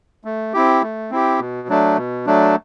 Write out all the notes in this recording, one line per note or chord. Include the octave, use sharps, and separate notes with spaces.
A3
C4 E4 G4
A3
C4 E4 G4
B2
F#3 A3 D4
B2
F#3 A3 D4